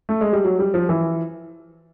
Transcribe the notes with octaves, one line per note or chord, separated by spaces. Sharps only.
A3
G#3
G3
F#3
G3
F3
E3